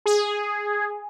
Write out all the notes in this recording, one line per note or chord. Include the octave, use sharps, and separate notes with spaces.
G#4